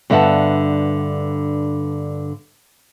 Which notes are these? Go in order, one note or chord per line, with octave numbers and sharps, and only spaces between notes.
G2 D3 B3 E5 F#5 A5